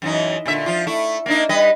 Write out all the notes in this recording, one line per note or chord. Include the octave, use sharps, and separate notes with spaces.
F#2 E3 D#4
A#2 D3 E5
F3 F4
A3 E4
A#3 D4 D#4
G3 B4 D#5